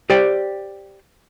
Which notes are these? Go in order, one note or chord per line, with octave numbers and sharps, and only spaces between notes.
G4 C5 D5 G5